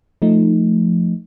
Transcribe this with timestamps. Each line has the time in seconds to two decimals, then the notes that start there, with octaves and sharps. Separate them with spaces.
0.22 F3 A3 D#4